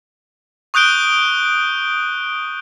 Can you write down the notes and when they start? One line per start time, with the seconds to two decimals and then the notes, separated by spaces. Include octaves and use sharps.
0.74 C#6 D#6 F#6 G6 D7 G7